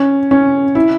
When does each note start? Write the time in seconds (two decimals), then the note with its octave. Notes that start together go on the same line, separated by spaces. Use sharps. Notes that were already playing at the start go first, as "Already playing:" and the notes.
Already playing: C#4
0.31 C#4
0.75 E4